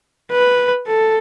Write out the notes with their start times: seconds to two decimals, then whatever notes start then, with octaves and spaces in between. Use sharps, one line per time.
0.32 B4
0.87 A4